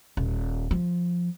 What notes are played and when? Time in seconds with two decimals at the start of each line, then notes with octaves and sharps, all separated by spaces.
0.17 D#1
0.71 F3